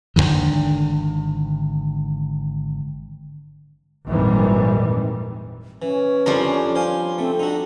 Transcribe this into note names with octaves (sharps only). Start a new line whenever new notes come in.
G#1 B2 D3 D#3
G#1 F2 A#2 D#3 E3 G3
E3 C#4
F2 F3 G3 D4 A#4
C5 F5 G#5
A3 C4
D4 D#4 F#4